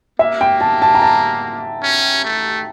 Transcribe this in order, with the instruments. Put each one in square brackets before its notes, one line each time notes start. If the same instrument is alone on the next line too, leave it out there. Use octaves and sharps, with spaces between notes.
[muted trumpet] A#3 [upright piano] E5
[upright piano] G5
A5
A5
A#5
A5
[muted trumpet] C#4
A3